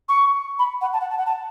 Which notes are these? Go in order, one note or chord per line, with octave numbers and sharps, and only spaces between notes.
C#6
B5
F#5
A5
F#5
A5
F#5
A5